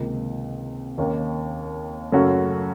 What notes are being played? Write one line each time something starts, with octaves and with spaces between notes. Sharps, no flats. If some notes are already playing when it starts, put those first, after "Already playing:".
Already playing: C#2 C3 D#3 A#3
D#2 D#3 A#3 C#4
F#2 C#3 A3 C#4 F#4